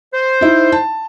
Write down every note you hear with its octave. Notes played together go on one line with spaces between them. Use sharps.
C5
D#4 E4
A5